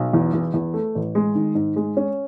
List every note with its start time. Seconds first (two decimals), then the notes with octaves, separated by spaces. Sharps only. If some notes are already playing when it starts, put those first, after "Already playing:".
Already playing: B1
0.13 E2
0.34 E2
0.54 E2
0.74 A3
0.95 A1
1.15 G#3
1.35 D#3
1.55 G#2
1.76 G#3
1.97 C#4